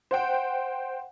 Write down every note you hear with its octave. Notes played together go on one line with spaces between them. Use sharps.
C5 F#5 G5